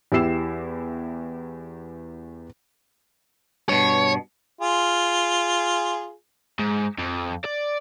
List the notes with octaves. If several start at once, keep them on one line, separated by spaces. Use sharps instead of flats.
E2 E4 G4 E6 C7 E7
G2 B2 C#5
F4 G#4
G#2
F2
D5